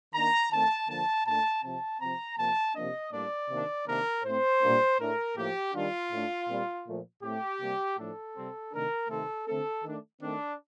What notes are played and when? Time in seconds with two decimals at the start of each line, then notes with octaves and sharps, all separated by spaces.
0.14 D#3 A#3 D4 A#5
0.51 D#3 A3 C4 A5
0.88 D3 F3 A#3 A5
1.26 A#2 A3 D4 A5
1.63 C3 F3 C4 A5
2.01 C3 F3 C4 A#5
2.38 C3 F3 A#3 A5
2.75 C3 F3 A#3 D4 D#5
3.12 A2 G3 A#3 D4 D5
3.50 C3 D#3 A#3 D4
3.87 C3 D#3 A#3 D4 A#4
4.24 A2 A3 C4 C5
4.61 A#2 G3 A#3 D4
4.99 A2 A3 D4 A#4
5.36 A2 F3 A#3 G4
5.74 D#3 G3 D4 F4
6.11 A2 A3 D4
6.48 A#2 G3 C4
6.86 A#2 F3 A3
7.22 A2 A3 C4 G4
7.61 C3 G3 A#3
7.98 A2 F3 A3 D4 A4
8.35 C3 G3 C4
8.72 C3 D#3 A3 D4 A#4
9.09 C3 D#3 A3 C4 A4
9.47 D3 A3 C4 A4
9.84 D#3 A3 D4
10.21 D#3 A3 C4 D4